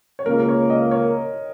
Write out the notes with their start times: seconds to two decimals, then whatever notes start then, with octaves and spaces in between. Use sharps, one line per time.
0.19 C#5
0.26 C#2 C#3 A#3 A#4
0.40 A#4
0.49 C#5
0.70 D#5
0.91 C#5